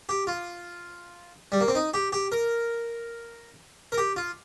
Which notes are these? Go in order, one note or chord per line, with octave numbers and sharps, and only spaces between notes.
G4
F4
G3
A#3
C4
D#4
G4
G4
A#4
A#4
G4
F4